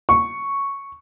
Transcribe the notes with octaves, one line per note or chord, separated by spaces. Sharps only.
C#6